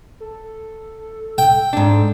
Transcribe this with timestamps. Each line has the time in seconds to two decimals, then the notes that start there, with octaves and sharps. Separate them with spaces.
0.20 A4
1.38 G5
1.73 G#2 D4